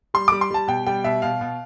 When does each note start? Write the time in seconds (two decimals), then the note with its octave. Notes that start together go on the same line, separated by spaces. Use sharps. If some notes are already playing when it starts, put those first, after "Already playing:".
0.14 G3 C6
0.28 G3 D6
0.41 C6
0.50 G3 A5
0.68 B2 G5
0.87 G3 G5
1.04 B2 E5
1.22 B2 F5
1.41 B2